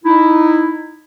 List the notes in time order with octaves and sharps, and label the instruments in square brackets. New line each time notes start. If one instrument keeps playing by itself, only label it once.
[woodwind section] D#4 E4